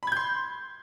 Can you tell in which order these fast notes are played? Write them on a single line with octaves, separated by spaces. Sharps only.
B5 G#6 G6 C6